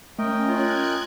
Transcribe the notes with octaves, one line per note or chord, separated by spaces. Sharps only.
A3 C#4 A#4 D#5 G5
F4 F#6 G#6